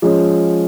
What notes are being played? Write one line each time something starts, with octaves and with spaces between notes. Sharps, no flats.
F3 G#3 C#4